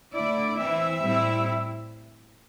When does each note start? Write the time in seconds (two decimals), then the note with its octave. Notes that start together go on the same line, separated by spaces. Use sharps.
0.13 D3 A3 E4 D5
0.57 E3 C4 E4 E5
1.02 A2 G3 C4 E4